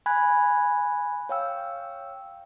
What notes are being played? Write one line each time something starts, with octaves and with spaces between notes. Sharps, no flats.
G#5 B5 F#6 G#6
C#5 F5 G5 E6